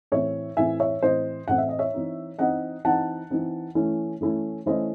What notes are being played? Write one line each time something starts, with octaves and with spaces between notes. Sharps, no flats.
A2 E3 C4 C#5 E5
A2 E3 C4 E5 G#5
C#5 E5
A2 E3 C4 C5 D#5
A2 E3 C4 F#5
E5
D#5
C#5 E5
E3 C4 D#4
E3 C4 D#4 D#5 F#5
E3 C4 D#4 F#5 A5
E3 C4 D#4
E3 A3 C#4 E4
E3 A3 C#4 E4
E3 A3 C#4 E4 C5 D#5